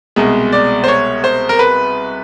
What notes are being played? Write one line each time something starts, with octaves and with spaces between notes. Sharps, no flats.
C2 B2 G#3
D5
C5
C#5
C5
A#4
B4